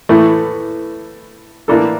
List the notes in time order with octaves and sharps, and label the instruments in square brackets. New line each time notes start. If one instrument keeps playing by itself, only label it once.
[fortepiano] A2 E3 A3
A2 E3 A#3 D4 A4